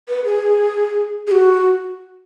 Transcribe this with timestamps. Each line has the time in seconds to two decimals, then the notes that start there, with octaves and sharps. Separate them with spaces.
0.08 B4
0.25 G#4
1.27 G#4
1.31 F#4